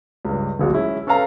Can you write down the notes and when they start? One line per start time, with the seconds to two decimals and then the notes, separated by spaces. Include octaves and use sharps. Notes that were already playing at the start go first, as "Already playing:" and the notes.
0.25 C#2 G2
0.59 D1 A#1 G#3 F#4
0.73 G#3 C#4 E4
1.07 C#4 A4 B4 F5 A#5